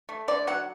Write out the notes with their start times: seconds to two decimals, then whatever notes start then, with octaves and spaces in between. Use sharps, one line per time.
0.09 A3
0.28 D3 D5
0.47 F#3 F#5